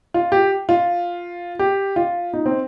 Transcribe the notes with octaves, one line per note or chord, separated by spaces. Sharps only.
F4
G4
F4
G4
F4
D#4
C4